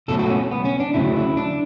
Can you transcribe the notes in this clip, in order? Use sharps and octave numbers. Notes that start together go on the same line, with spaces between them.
C#2 B2 F#3 A3 A4
F#4
C#4
B3
C#4
D4
D2 C#3 F#3 E4
E4
D4